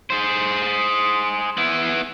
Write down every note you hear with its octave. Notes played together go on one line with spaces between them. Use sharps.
G#4 C5
B3 E4